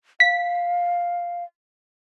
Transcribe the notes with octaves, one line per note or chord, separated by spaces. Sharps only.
F5 B6